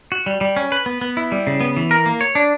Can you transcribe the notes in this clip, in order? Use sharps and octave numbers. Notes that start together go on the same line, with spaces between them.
F#4
G3
G3
C#4
B4
B3
B3
E4
G3
C#3
B3
E3
A#4
A#3
C#5
D4